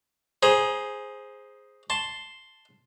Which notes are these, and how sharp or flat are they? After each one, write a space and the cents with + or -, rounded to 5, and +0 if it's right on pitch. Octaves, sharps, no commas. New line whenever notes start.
G#4 +0 C5 +0 A#5 +35
A5 +0 C6 +0